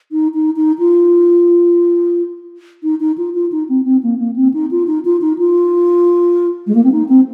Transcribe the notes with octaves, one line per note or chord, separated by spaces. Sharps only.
D#4
D#4
D#4
F4
D#4
D#4
F4
F4
D#4
C4
C4
A#3
A#3
C4
D#4
F4
D#4
F4
D#4
F4
G#3
A#3
C4
D#4
C4